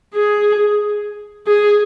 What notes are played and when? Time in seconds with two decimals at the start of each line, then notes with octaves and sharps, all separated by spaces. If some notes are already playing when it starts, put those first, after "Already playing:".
0.15 G#4
1.47 G#4